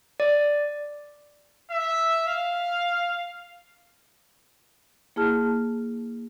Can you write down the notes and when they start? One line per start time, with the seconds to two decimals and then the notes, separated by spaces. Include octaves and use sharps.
0.20 D5
1.71 E5
2.28 F5
5.16 A#3 E4 G#4 A5 F6